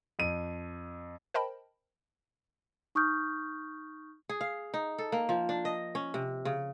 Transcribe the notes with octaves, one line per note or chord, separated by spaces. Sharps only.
F2 D#7
A#4 C5 D#5 G5 A5 B5
D#4 C#6 D#6 F6 G6
G#4
F5
D#4
A4
A#3
F3
D4
D#5
C#4
C3
C#3